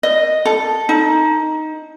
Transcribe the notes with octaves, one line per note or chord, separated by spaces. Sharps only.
D#5
A4
D#4